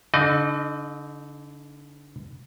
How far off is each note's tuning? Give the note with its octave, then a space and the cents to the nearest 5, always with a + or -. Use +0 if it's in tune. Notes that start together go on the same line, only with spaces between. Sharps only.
D3 -30 D#4 +0 D#5 -45